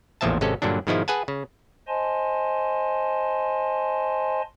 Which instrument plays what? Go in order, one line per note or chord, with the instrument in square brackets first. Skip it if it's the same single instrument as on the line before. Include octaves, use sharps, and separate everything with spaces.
[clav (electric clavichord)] A1 E2 A#2 F3 E5 A5
G#1 C3 G#3 C#4 A4
G2 A#2 D3 F#3 D4
G#2 B2 D#3 F3 G#3 E4
G#4 B4 F#5 G#5 A5
C#3
[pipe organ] C5 D#5 G#5 A5 C6